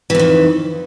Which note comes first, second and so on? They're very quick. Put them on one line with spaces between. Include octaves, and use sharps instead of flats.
E3 F2 D#3